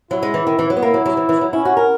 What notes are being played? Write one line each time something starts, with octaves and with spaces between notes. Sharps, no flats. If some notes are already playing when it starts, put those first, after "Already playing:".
F#3 E4
G#3
E3
D#3
E3
F#3
B3
A#3 E4
F#3
F#3
E3
E3
F#3
C#4 E4
F#4
A#4